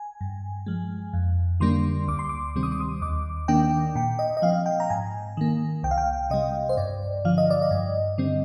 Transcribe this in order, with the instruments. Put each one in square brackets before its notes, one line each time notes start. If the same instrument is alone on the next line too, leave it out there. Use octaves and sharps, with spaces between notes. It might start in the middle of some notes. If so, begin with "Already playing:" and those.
Already playing: [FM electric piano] G#5
G2
F3 G#3
F2
D3 G3 A#3 D4 C6
D2 D6
C6
D6
C3 D#3 G3 C4
D#6
D6
D#6
D#2 D6
D#3 A#3 D4 G5
A#2 G5
D#5
D#5
F3 C4 F5
G5
A#5
G#2 G#5
D#3 A#3
C2 G5
F5
G5
C3 G3 D#5
C5
G2 D5
D3 F3 F5
D#5
D5
D#5
G2
D3 G3 C4